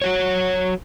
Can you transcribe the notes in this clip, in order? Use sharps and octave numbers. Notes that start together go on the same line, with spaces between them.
F#3 F#4 C#5